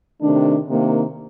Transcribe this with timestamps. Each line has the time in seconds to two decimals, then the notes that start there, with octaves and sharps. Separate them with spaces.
0.22 C3 D#3 A3 D4
0.67 C3 D#3 A#3 D4